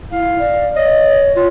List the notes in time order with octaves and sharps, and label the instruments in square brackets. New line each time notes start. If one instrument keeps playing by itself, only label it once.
[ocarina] E4 [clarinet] F5
[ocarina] D5
[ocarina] C#5 [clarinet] D#5
[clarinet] F4 [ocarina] C#5